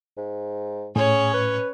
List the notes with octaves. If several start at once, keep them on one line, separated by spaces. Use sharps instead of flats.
G#2
A2 C#4 G#4 C#5
B4